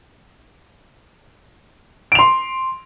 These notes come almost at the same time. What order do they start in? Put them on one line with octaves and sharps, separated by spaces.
D7 F7 C6